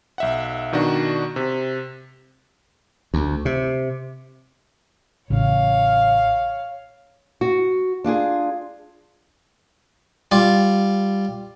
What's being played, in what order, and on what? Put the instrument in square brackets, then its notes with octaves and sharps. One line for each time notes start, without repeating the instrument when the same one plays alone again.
[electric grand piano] B1 E5 F#5
B2 D#3 D4 F#4
C3
[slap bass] D2
C3
[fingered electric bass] A1 C#3 [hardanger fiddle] C#5 F5
[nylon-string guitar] F#4
D4 F4 G4 G#4
[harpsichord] G3 F4